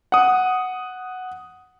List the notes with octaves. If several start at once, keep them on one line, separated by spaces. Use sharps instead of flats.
F#5 D#6